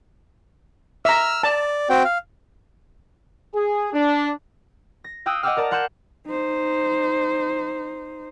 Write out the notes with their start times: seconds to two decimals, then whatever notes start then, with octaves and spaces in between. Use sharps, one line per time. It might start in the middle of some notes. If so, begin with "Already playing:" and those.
1.05 E5 A#5 E6 F6
1.43 D5 A5
1.90 C4 F#4 G5
2.05 F5
3.54 G#4
3.93 D4
5.04 A#6
5.26 F5 G5 D#6 E6 F#6
5.43 D#5 F#5 G5 D6 E6 F6
5.57 A#4 D5 A5 A#5
5.71 F5 F#5 C6 F6 G6 E7
6.27 D#4 C5